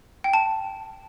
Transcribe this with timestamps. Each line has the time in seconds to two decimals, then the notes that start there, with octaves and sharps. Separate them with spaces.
0.24 G5
0.33 A5